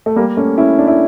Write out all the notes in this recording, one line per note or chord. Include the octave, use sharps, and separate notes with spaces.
A3
G3 A#3
A3 C#4
C#4 E4
D4
E4